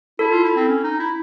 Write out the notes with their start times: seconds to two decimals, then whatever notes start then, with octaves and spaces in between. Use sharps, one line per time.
0.19 E4 A4
0.31 F4
0.44 E4
0.56 C4
0.68 C#4
0.84 D#4
1.00 E4